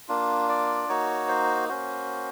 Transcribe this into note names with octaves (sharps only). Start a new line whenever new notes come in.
A#3 D4 F4
D5
A#3 D#4 F#4 C#5
C5
A#3 C#4 F#4 C5